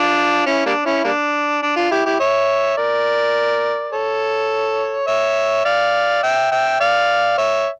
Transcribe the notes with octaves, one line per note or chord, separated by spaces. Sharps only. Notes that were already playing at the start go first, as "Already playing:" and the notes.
Already playing: D4 F4
C#4 E4
G3 A#3 D4
C#4 E4
G3 A#3 D4
D4
D4 F4
E4 G4
E4 G4
C#5 E5
A#4 D5
A4 C#5
C#5 E5
D5 F5
E5 G5
E5 G5
D5 F5
C#5 E5